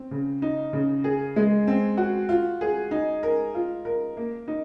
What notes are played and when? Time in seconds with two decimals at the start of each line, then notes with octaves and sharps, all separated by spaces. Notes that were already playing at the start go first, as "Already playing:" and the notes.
Already playing: C4
0.11 C#3
0.42 D#4
0.73 C#3
1.04 G#4
1.36 G#3
1.67 C4
1.97 F#4
2.29 F4
2.61 G#4
2.91 D#4
3.23 A#4
3.55 F4
3.85 A#4
4.17 A#3
4.48 D#4